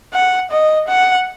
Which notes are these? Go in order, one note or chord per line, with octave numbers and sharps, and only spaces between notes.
F#5
D#5
F#5